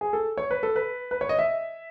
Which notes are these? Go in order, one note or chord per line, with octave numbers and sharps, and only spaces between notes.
G#4
A4
C#5
B4
A4
B4
B4
C#5
D#5
E5